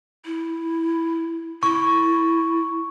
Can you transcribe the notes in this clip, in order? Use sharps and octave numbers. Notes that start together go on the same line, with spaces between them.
E4
E4 C#6